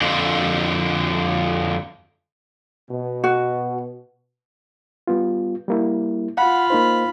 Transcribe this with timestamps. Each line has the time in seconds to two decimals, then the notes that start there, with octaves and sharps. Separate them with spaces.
0.01 F2 D3
2.90 B2
3.24 F#4
5.07 G3 B3 F4
5.68 G3 A#3 E4
6.37 F4 F5 F#5 B5
6.70 A#3 D#4 C5